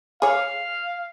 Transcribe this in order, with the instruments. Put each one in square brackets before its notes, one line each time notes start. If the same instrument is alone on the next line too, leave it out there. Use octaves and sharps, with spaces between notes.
[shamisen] G#4 C#5 [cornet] F5